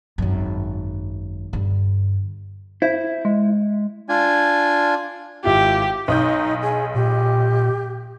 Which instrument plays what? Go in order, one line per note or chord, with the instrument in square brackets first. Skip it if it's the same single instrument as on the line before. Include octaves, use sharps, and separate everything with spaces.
[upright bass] G#1 F#2
G2 D3
[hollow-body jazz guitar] E4 [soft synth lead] C5
[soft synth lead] G#3
[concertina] D4 F4 G#5
[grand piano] G#1 E4 F4 [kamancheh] G4
[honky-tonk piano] B1 D#6 G6 [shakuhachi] D#4
[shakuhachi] G#4
[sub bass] A#2 [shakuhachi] G4